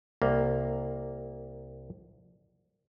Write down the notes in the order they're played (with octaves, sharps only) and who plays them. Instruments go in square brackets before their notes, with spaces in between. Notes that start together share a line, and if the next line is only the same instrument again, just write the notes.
[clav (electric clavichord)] C2 A#3